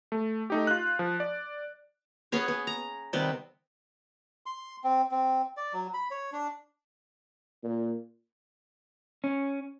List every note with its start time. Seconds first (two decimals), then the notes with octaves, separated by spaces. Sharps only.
0.12 A3
0.50 A3 D#4 G4
0.67 F4 F#6
0.99 F3
1.20 D5
2.32 B3 C#4 G#4 C#5
2.48 B3
2.67 A#5
3.13 C3 D#3 G3 B3
4.46 C6
4.84 C4
5.11 C4
5.57 D5
5.73 F#3
5.94 B5
6.11 C#5
6.32 D4
7.63 A#2
9.24 C#4